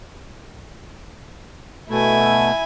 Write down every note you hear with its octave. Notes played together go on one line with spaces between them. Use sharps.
B2 A3 E4 G#5